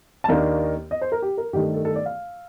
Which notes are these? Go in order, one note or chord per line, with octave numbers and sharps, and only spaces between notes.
A5
D#2 D#3 A#3 D4 A#5
D#5
C5
A#4
G4
A#4
G2 D#3 A3 G4
A4
A4
D5
F5